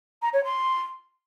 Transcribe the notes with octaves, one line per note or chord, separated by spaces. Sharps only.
A#5
C#5
C6